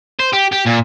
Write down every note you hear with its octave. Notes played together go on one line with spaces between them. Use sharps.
C5
G4
G4
A#2